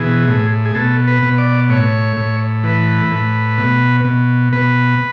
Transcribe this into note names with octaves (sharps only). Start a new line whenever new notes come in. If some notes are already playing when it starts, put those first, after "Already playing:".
Already playing: B2 E3 G#4
A2
G#4
B2 A4
B4
B2
D5
A2 C#5
A2
E3 B4
A2
B2
B2
B2 B4